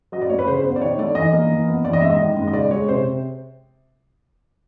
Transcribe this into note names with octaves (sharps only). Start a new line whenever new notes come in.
F#3 D#5
D5
A2 C#5
B4
C#3 C5
B3 C5
D5
D#3 C#5
A3 D5
E3 D#5
A#3
E3
B3
E3 D5
D#5
G#2 E5
D#5
D#3
G#2
D#5
C#3 D5
G#3 C#5
C3 C5